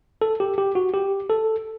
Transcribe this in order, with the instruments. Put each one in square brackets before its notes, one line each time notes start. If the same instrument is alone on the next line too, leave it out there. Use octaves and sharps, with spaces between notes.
[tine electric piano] A4
G4
G4
F#4
G4
A4